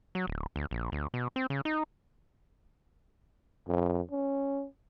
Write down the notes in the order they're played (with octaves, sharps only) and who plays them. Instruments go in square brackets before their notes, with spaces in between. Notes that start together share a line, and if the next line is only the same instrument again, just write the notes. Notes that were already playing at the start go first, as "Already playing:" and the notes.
[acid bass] F#3
D1
D2
A#1
D2
B2
C4
C#3
D#4
[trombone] F2
C#4